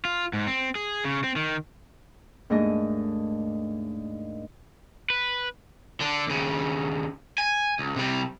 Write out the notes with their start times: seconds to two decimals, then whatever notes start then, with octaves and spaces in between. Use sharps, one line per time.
0.05 F4
0.33 G#2
0.47 C4
0.75 G#4
1.05 C#3
1.24 C4
1.36 D#3
2.50 D#2 G#2 A3 D4 D#5
5.10 B4
6.00 D3 D4
6.27 D#2 C#3
7.38 G#5
7.79 C#2
7.96 C3 G3